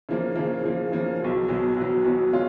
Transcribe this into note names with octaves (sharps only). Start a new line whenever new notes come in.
C#3 F3 A#3
C#3 F3 A#3
C#3 F3 A#3
C#3 F3 A#3
B1 B2 F#3
B1 B2 F#3
B1 B2 F#3
B1 B2 F#3
C#3 G#3 C#4 F4